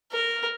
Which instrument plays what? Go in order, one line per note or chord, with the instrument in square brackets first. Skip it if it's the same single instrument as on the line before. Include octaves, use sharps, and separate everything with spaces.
[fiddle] A#4